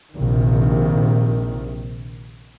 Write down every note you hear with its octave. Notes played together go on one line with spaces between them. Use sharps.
A#1 C3 D#3